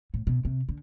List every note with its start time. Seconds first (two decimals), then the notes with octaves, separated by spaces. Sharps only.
0.14 A2
0.27 B2
0.45 C3
0.69 D3